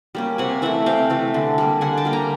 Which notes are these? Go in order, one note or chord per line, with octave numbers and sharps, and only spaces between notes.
G3 A#3 C#4
C3 F#5 G#5
E3 A3 E5 F#5
C3 F5 G5
E3 A3
D3
G3 A#3
D3 F#5 G#5
G5 A5
G3 A#3
G#5 A#5